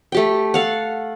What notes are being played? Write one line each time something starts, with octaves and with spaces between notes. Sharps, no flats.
A3 G4 G5
A4 F5 F#5